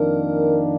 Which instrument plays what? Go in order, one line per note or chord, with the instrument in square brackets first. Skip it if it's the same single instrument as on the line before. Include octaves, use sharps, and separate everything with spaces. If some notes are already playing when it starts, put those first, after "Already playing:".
Already playing: [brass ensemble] F2 D#3 A#3 D4 [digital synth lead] A#4